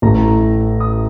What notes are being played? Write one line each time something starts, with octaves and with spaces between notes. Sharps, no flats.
A1 A2 A3 A#5
D#6